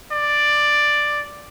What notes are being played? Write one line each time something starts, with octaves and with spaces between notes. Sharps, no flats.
D5